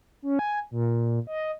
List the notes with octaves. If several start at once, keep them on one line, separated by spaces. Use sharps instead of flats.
C#4
G#5
A#2
D#5